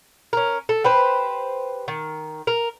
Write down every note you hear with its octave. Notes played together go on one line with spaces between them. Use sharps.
C#4 A#4
A4
G4 B4 C5
D#3
A#4